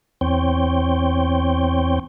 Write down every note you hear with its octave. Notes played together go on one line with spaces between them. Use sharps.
E2 C4 C#5 G5